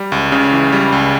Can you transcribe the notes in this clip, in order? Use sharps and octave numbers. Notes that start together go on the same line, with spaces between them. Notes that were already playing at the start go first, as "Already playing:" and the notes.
Already playing: G3
C#2
C#3
E3
G3
C#2